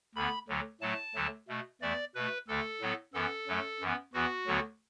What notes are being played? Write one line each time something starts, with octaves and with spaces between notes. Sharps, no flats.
D2 D3 B3 B5
D2 D3 F#3
A2 F#3 A3 A5
D2 D3 F#3 A3
B2 A3
E2 E3 A3 D5
B2 A3 B4
D2 D3 A3 A4
A2 F#3 B3
F#2 E3 B3 A4
F#2 F#3 A3
F#2 E3 B3
E2 E3 B3 F#4
D2 D3 F#3 B3